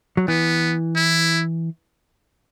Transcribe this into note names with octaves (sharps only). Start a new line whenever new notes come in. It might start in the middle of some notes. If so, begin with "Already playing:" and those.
F#3
E3 B3
E4